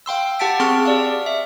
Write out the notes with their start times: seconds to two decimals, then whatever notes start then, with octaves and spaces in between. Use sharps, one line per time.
0.06 F5 G5 C6 E6
0.39 G4 F#5 A5 A6 B6 D7
0.60 C4 G#4 C6 C#6 E6 F6
0.85 G4 D5 F5
1.26 E5